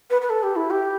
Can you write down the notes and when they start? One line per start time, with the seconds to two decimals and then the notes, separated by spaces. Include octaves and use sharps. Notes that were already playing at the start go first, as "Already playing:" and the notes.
0.10 B4
0.22 B4
0.30 A4
0.43 G4
0.56 E4
0.70 G4